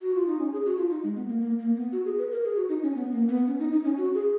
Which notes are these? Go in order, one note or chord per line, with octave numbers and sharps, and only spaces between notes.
F#4
F4
D#4
C#4
G#4
F#4
F4
D#4
G#3
B3
A#3
A#3
A#3
B3
F#4
G#4
B4
A#4
G#4
F#4
D#4
C#4
B3
A#3
B3
C#4
D#4
D#4
C#4
F#4
G#4